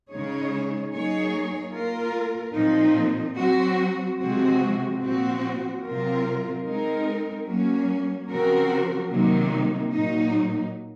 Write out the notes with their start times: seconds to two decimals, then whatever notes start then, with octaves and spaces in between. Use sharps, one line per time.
0.10 C#3 G#3 D#4 G#4 C#5
0.92 F#3 A#3 D#4 G#4 C#5
1.74 A#3 F4 A#4
2.55 A#2 F3 C4 D#4
3.37 F#3 C4 F#4
4.20 C3 F3 G#3 C4 F#4
5.02 A#2 F3 C4 F#4
5.83 C3 F#3 C4 F4 A#4
6.65 G#3 C4 D#4 A#4
7.47 F#3 A#3 C#4
8.29 C#3 F3 C4 F#4 A#4
9.11 C3 D#3 F#3 A#3 D#4
9.93 A#2 F#3 A#3 D#4